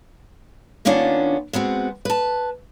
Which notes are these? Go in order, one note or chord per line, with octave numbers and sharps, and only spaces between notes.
D#3 A#3 B3 C#4 D4 F4
G#3 B3 C4 F#4
B4 A5